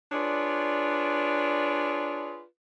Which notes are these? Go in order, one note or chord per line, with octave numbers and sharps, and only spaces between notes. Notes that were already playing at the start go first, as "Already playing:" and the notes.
D4 F4 G#4 B4 C#5 D5